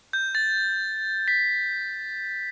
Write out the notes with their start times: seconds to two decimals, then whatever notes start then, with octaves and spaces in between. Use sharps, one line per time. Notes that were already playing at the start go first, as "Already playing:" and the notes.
0.13 G6
0.35 A6
1.28 B6